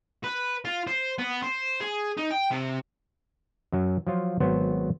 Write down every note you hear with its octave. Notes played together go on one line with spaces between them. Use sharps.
B4
F4
C5
B3
C5
G#4
D#4
G5
C3
F#2 F#3
F3 F#3 F4
G#1 F#3 B3 C5